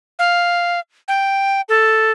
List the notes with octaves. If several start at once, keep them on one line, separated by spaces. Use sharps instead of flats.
F5
G5
A4